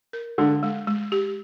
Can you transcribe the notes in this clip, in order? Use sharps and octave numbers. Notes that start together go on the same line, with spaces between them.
A#4
D3 G#3
G#3
G#3
G4